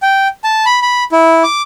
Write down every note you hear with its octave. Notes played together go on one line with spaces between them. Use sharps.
G5
A5
B5
B5
E4
D6